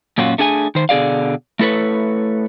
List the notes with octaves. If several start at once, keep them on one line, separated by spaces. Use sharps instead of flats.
F#2 A#2 C#4 F4 F#4
A3 D4 G#4 F#5 G#5
D#3 C5
B2 D3 G#4 D5 F5
A3 E4 A4 B4 C#5